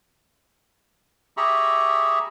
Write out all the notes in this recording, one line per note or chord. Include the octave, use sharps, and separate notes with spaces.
G4 G#4 E5 A#5 B5 C#6